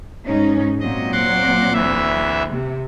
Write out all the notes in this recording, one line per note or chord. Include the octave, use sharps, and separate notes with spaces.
G#2 C#4 D#4
A#2 F#3 C4 D#5
F#5 C6 D6
D2 E3 E5
C3